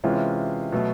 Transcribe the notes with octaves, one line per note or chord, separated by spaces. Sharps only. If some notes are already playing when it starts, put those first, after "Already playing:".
C3 E3 G#3 C#4 F4
B2 F#3 A3